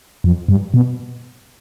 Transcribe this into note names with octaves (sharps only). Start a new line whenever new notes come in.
F2
G2
B2